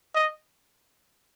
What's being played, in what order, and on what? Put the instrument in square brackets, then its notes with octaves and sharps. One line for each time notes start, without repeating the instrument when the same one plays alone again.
[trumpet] D#5